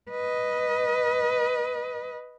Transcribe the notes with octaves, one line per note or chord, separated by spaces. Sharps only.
B4 D#5